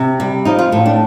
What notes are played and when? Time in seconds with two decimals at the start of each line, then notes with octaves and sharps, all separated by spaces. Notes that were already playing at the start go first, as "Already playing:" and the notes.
Already playing: C3
0.20 G3
0.45 F3 D#4
0.59 F4
0.72 A2
0.86 D4